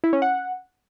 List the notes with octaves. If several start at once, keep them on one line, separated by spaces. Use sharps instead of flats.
E4
C#4
F#5